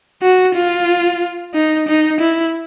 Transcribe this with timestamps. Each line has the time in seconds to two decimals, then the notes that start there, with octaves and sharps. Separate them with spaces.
0.23 F#4
0.55 F4
1.54 D#4
1.88 D#4
2.20 E4